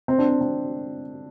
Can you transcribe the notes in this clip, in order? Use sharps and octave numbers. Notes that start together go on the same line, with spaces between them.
C4
D4
C4
C4